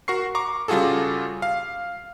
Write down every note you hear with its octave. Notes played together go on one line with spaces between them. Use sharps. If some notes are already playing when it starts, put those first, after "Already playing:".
F#4 A#4 C#6 C7
A#5 C#6 D6
C#3 G3 F4 F#4 G#4 A4
F5